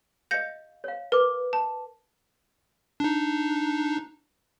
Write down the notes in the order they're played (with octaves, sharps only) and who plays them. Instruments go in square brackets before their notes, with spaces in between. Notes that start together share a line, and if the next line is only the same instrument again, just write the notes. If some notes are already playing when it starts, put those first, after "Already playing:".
[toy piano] D#5 F5 [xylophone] G6 A#6 C#7
[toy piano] C#5 F5
[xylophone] A#4 [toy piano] B4 D6
[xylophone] A5
[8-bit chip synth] D4 D#4